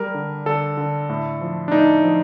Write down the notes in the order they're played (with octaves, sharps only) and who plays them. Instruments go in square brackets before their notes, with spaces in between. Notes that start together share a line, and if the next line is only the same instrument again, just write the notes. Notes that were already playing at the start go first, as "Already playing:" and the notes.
Already playing: [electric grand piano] G3 A#4
D3
D3 A4
D3
A2
F3
D4
A2 D#4
F3